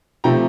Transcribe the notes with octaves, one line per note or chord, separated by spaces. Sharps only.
C3 F3 A3 G5 A#5